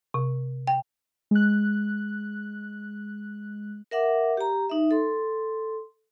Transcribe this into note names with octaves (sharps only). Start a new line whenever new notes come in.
C3
G5
G#3 F#6
A#4 E5 F#5 D6
G4 A#5
D#4 E5
A4 C6